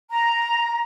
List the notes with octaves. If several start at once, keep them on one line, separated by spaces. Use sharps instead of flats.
A#5